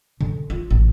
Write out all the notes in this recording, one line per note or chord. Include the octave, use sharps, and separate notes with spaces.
D3
F4
A1